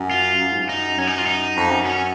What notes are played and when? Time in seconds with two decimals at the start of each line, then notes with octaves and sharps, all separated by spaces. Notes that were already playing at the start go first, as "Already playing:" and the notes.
Already playing: F#2
0.11 F4
0.41 F#2
0.52 G#2
0.62 F#2
0.69 D#4
0.98 F#2 C#4
1.07 D#4
1.18 F4
1.27 D#4
1.56 F2
1.70 F#2
1.85 C#4